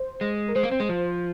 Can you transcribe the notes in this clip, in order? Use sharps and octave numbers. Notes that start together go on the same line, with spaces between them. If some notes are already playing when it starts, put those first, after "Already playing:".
Already playing: C5
G#3
A#4
G#3 C5
A#3
C4
G#3
F3